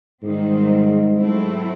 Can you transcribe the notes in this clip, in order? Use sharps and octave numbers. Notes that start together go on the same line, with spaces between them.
G#2 D#3 G3 C4
F#3 A3 C4 E4